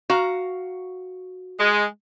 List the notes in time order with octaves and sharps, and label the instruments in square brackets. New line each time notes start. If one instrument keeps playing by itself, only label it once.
[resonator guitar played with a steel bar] F#4 F5 A#5
[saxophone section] G#3